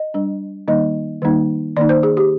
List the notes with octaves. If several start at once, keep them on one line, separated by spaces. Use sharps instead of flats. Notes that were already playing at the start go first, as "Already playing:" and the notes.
Already playing: D#5
G3 D4
D#3 G3 A#3 D#4 D#5
D#3 G3 A#3 D#4
D#3 A#3 D#4 D5
C5
G#4
G4